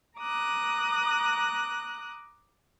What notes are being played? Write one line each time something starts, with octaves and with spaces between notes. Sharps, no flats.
A#5 D6 D#6 F#6